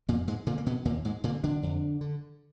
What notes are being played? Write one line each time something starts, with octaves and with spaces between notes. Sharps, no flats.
F2 A#2 A#3
G#2 G#3
A#2 D3 A#3
A#3
B2 B3
D#2 A#2 A#3
G#2 G#3
A#2 D3 A#3
D3 D4
F2
D3